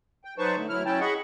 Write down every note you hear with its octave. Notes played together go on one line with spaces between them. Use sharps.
G5
F#3 D#4 B4 C5 A5 C#6
D3 A3
D2 F#3 E4 F6
F#3 C#4 E4 G5 A5
G#4 D#5 F#5 B5 C#6